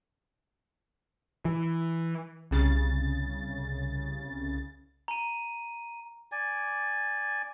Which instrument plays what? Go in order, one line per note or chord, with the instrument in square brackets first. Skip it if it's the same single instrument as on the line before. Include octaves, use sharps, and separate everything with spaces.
[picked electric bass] E3
[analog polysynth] C2 C#3 A6
[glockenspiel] A#5 D#7
[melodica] D5 G#5